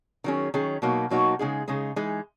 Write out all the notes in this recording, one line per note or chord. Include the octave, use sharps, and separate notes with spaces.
D#3 F#3 C#4 G#4
D#3 F#3 C#4 G#4
B2 F#3 A#3 D#4 F#4
B2 F#3 A#3 D#4 F#4
C#3 G#3 D#4 G#4
C#3 G#3 D#4 G#4
E3 G#3 D#4 G#4